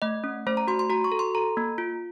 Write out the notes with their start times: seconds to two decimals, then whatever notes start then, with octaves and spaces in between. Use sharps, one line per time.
0.02 A3 D#5
0.24 C#4
0.47 A3 C5
0.57 A#5
0.68 F#4 C6
0.79 C6
0.90 F#4 A#5
1.04 C#6
1.12 A4
1.19 C6
1.35 A4 A#5
1.57 A#3
1.78 F4